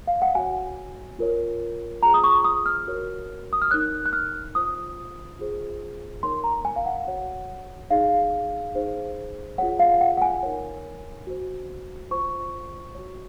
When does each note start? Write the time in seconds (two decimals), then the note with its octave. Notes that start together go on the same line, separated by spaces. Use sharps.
0.07 F5
0.22 F#5
0.35 F#4 C#5 G#5
1.19 F4 A#4 C#5
2.03 F4 G#4 C5 A#5
2.14 D#6
2.24 C#6
2.44 D#6
2.66 F6
2.87 F#4 A#4 C#5
3.53 D#6
3.62 F6
3.71 D#4 A#4 C#5 F#6
4.06 F#6
4.13 F6
4.55 F4 C5 D#6
5.39 F4 G#4 C5
6.23 D#4 A#4 C#5 C6
6.44 A#5
6.65 G#5
6.76 F5
6.86 F#5
7.07 F#4 C#5
7.91 D#4 G#4 C#5 F5
8.75 D#4 G#4 C5
9.58 F4 G#4 C#5 F#5
9.79 F5
10.01 F#5
10.17 F#5
10.22 G#5
10.43 D#4 A#4 C#5
11.27 F#4 C5
12.11 F4 C5 C#6
12.95 F#4 C#5